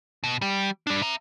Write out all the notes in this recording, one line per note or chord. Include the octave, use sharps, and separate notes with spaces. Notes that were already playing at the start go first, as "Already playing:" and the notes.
B2
G3
G3 D4
E5 A#5